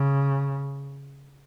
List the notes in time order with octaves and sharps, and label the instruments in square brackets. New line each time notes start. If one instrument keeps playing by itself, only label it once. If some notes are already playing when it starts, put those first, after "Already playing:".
Already playing: [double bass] C#3